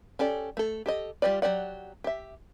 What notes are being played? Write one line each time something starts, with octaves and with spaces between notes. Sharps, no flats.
C#4 G4 A4 D5
A3 A4
G4 A4 D#5
G3 F4 G4 B4 D5
F#3 D#4 G4 D5 F#5
G4 E5